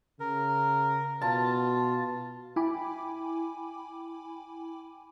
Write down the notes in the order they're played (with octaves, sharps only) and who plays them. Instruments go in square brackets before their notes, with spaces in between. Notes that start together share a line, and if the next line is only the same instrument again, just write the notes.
[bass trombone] C#3 [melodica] A#4
[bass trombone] B2 [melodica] F4 [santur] A5
[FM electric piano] E4 G5 G#5 B5 D6